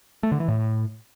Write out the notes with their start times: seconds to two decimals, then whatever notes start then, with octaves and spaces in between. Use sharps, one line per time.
0.23 A3
0.32 D3
0.40 E3
0.48 A2